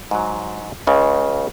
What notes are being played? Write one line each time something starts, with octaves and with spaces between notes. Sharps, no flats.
G#2 F#3
C#2 C#3 G#3